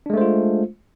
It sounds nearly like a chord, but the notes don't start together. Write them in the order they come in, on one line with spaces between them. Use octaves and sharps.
D4 G#3 A3 C5 F4